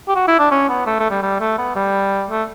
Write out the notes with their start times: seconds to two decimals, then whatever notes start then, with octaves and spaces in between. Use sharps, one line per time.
0.08 G4
0.15 F#4
0.28 E4
0.39 D4
0.51 C#4
0.69 B3
0.86 A3
0.99 A3
1.10 G3
1.22 G3
1.40 A3
1.58 B3
1.75 G3
2.30 A3